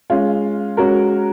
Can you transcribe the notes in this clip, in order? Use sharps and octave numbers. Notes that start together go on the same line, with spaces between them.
G#3 C#4 F4
G#3 C#4 F#4 A#4